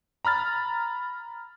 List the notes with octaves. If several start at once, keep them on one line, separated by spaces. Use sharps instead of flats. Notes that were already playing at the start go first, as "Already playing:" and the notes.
A#5 B5 F6 A6